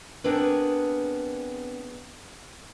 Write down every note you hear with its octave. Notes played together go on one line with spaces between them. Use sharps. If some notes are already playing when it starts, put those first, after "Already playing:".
B3 C4 D4 G#4 A#4 B4